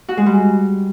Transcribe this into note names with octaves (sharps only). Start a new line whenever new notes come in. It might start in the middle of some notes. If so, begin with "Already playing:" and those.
F#4
G#3
G3